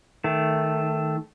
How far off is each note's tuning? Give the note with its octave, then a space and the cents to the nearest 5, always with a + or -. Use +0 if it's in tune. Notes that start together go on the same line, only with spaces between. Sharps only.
D#3 +0 A3 +0